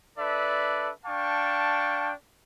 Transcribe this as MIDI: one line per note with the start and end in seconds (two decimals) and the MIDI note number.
0.19 0.90 62
0.19 0.90 69
0.19 0.90 71
0.19 0.90 74
0.19 0.90 76
1.06 2.11 62
1.06 2.11 77
1.06 2.11 79
1.06 2.11 81
1.06 2.11 85